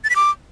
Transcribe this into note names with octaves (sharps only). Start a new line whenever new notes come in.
A6
B6
D6